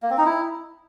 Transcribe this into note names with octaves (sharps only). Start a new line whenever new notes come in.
A#3
C4
D#4
E4